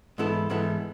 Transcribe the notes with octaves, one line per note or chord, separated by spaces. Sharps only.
G#2 E3 B3 E4 A4
G#2 E3 B3 E4 A4